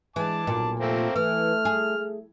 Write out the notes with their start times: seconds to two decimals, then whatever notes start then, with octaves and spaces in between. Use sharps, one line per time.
0.16 E3 G#3 A5 D6
0.47 B1 A#2
0.79 F1 A3 A#3 C4
1.16 E3 A3 F6
1.65 G#4
1.97 A3